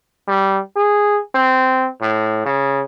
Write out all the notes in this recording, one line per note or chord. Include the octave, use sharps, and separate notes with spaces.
G3
G#4
C4
A2
C#3